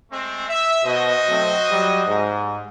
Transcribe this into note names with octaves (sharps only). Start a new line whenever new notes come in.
G#3 A3 C4
E5
B2 F#4 C5 D#5
F#3 A3 C4
F#3 G3
G#2